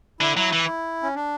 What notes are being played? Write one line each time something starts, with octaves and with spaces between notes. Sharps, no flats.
D3 E4
F#3 E4
E3
C#4
D4